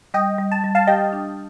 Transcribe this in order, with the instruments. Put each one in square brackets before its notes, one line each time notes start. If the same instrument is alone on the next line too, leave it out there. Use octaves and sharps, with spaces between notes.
[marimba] G3 [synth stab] D#5 G5
[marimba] G3
[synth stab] A5
[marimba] G3
[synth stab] F5 A5
[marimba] G4 [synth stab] D#5 G5
[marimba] D4